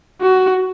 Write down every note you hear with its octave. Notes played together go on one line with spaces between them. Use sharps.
F#4